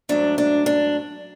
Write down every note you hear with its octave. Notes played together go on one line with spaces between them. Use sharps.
G#2 F#3 A3 D4
D4
D4